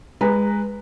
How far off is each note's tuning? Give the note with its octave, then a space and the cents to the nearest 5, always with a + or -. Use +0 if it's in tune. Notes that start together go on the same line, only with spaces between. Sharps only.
G#3 -15 B4 -5 A#5 -10